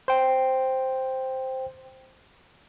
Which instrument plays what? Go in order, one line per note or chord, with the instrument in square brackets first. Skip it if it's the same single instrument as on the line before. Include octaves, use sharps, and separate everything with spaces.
[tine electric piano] C5 G5